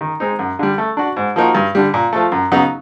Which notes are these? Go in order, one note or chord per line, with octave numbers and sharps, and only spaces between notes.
D#3
G#3 C4 D#4
F#2
D3 G3
A3
D4 F#4
G#2
F3 A#3 D#4 F#4
G2
D3 G3
A#2
F3 A3
F#2
C#3 F#3 B3 D#4